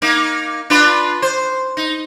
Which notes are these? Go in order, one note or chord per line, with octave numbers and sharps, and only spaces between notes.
A#3 D#4
D4 F4 B4
C5
D#4